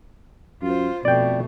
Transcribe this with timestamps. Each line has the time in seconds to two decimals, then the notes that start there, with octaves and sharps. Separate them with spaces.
0.62 F#2 F4 C5
1.05 F2 B2 A3 D5 G5